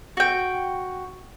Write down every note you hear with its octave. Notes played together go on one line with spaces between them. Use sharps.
F#4 G5